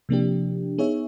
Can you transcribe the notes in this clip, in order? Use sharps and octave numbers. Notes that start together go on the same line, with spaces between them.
C3 F3 A#3 D4 G4
B3 D#4 G#4 C#5 E5